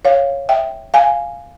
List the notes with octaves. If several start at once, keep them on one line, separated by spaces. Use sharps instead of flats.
C#5 F5
E5 G5
F5 G#5